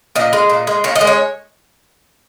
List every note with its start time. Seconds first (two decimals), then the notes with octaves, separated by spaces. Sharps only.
0.16 A#2 D#5
0.33 G#3
0.49 A#2
0.67 G#3
0.84 A#2 C#5
0.95 D#5
1.01 G#3
1.07 C#5